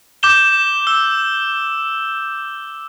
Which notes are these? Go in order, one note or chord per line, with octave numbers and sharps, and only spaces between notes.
D6 G6 E7 G7
E6 G7